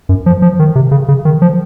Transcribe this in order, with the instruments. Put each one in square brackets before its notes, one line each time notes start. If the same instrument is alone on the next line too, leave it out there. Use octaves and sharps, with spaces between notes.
[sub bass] F#2
F3
F3
D#3
C3
C#3
C#3
D#3
F3